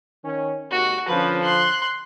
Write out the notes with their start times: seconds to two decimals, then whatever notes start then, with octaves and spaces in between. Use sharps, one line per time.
0.25 D#3 C#4
0.71 G#1 D#2 F#4
1.08 D3 F3 C#4 B4
1.43 C6 F#6